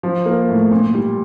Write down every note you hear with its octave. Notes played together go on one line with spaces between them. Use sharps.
F3
A#3
A2
A#2
G3